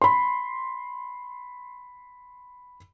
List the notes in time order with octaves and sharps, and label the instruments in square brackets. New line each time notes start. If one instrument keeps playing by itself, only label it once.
[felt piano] B5 C6